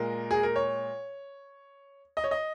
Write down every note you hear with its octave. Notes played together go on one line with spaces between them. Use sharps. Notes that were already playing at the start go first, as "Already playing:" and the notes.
Already playing: A#2 G#3 A#4
G#4
A#4
C#5
D#5
C#5
D#5